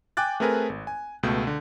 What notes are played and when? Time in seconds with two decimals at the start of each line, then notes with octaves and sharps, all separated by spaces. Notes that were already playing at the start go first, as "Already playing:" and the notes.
0.17 G5 G#5 D6 F#6 A6
0.40 A3 C4 G#4 A#4 B4 G#5
0.70 G#1
0.87 G#5
1.23 C#2 B2 A3 G6
1.47 D3